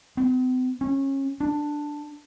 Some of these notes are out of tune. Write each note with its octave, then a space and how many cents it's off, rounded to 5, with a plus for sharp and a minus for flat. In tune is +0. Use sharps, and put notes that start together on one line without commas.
C4 -45
C#4 -25
D4 +5